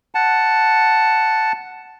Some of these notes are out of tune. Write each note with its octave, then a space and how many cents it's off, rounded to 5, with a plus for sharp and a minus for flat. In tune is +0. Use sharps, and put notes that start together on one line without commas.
F#5 +0 A5 +0